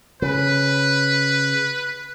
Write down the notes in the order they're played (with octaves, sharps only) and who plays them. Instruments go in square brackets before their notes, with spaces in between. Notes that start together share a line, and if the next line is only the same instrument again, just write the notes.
[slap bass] C#3 [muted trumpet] B4